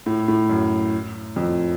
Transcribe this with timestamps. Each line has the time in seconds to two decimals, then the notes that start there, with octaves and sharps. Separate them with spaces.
0.06 A2
0.28 A2
0.49 F#2
1.36 F2